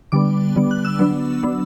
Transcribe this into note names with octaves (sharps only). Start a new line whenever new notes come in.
D3 G3 B3 D6
D3 G3 B3
F#6
E6
F#3 B3 D4
F#3 B3 D4